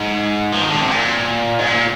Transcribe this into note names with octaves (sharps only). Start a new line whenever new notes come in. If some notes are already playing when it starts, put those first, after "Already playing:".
Already playing: G#2
F3
D#3
D3
C3
A#2
G#2
A#2